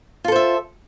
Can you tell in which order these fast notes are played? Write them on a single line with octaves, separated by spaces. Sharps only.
F4 A4 C5 E5